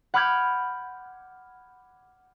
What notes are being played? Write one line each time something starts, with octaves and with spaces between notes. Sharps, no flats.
F#5 B5 D6 F6 G6 G#6